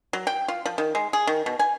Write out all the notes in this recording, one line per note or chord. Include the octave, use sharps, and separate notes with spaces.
F#3
G5
F4
F3
D#3
G#3
G#4
D#3
B2
G#5